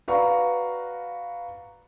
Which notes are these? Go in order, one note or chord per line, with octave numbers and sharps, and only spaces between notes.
F#4 B4 D5 F5 A#5 C#6